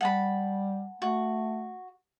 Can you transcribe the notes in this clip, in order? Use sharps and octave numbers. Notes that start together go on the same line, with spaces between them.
G3 F#5 A5 B5
A3 F#4